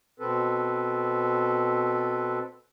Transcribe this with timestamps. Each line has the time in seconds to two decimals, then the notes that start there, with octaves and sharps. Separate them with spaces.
0.20 B2 C4 A4 B4